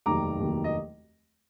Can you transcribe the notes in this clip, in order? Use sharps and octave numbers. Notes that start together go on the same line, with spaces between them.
F1 D#2 D#3 F#3 A#5 D6
F1 D#2 D#3 F#3
D#5